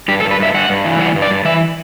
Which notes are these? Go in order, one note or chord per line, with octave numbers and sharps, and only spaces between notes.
G2 G4
A4
G2
B4
G2 E5
G2 F#5
G2
E3
G3 F#5
G2
D5
G2
E3 E5